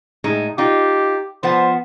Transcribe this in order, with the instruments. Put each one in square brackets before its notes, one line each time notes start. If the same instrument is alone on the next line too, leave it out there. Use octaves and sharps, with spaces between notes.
[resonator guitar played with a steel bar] A2 G#3 D#4
[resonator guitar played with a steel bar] D#4 F4 [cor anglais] G4
[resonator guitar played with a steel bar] F3 B3 F#5 [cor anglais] C5